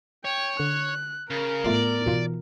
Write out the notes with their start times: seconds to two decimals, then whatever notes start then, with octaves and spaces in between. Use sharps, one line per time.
0.24 C#5 G5
0.60 D3 F#6
1.30 C#3 A#4 F6 A6
1.64 A2 A3 B3 F4 D5 C7
2.06 B2 D#3 E3 F4